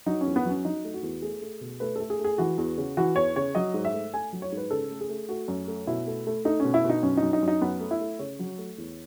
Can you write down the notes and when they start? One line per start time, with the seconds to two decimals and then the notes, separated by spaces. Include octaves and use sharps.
0.06 F#3 D#4
0.21 C#4
0.26 E2
0.36 B3
0.45 F#3 C#4
0.65 F#3 D#4
0.84 A3
0.94 F#4
1.03 E2
1.22 A3 G#4
1.42 A3
1.61 B2
1.80 A3 B4
1.96 A3 A4
2.10 G#4
2.19 A3
2.24 G#4
2.38 E3 F#4
2.58 E2
2.78 C#3
2.97 E3 F#4
3.16 E2 C#5
3.36 C#3 C#5
3.55 F#3 D#5
3.74 G#2
3.85 E5
3.94 A3
4.14 A3 G#5
4.33 F#3
4.42 C#5
4.52 G#2
4.57 B4
4.71 C#3 A4
4.91 A3
5.01 G#4
5.09 A3
5.29 A3 F#4
5.48 F#2
5.68 A3
5.87 B2 E4
6.07 A3
6.27 A3
6.45 A3 D#4
6.60 B2 C#4
6.74 E4
6.84 B2
6.90 D#4
7.03 F#2 C#4
7.17 D#4
7.23 F#2
7.33 D#4
7.43 F#2
7.48 D#4
7.62 F#2 B3
7.80 A3
7.91 E4
8.01 A3
8.19 C#3 C#5
8.39 F#3
8.58 A3
8.78 E2